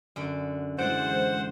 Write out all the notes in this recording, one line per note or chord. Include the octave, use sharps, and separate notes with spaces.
F#2 D3 D4
E3 G#3 C5 D5 F#5